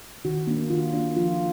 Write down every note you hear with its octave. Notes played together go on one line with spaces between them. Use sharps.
D#3 F#4
A#3 D4
D#3 F4
A#3 D4
F3 F4